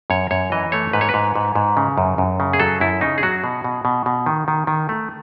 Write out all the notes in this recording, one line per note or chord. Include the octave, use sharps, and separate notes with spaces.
F#2 C#5
F#2 C#5
E3 D#5
A3 C#5
G#2 B4
C#5
B4
G#2
G#2
G#2
C#3
F#2
F#2
C#3
G#4
F#3 A4
F#2 E4
C#3 D#4
G#4
F#3 F#4
B2
B2
B2
B2
D#3
D#3
D#3
A3